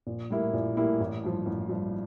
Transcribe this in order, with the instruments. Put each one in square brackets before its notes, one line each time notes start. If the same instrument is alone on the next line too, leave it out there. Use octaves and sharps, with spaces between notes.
[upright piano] A#1
A2 G3 A#3 E4
A#1
A2 G3 A#3 E4
A1
G2 F3
A1
G2 F3